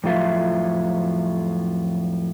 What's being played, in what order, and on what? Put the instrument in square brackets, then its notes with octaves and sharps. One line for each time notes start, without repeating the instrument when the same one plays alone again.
[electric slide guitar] F2 A2 F#3 F4 E5